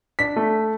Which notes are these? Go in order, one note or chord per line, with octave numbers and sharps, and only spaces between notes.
D4 B6
A3